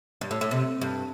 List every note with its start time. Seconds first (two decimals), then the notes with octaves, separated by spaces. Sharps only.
0.21 G2
0.31 A2
0.41 A2
0.51 C3
0.81 G2